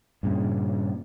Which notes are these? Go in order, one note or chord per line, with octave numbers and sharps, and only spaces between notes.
G2 A#2 C#3